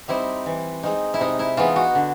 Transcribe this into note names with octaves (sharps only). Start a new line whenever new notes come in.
G3 C4 D#4 E4
E3
G#3 C4 D#4
E4
C3 D#4
E4
E3 G#3 B3 D#4 F4
F#4
D3